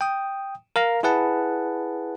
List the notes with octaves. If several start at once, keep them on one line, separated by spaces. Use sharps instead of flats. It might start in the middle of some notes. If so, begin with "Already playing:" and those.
G5 D#6
A#4 F5 A#5
E4 G#4 B4 F#5 A5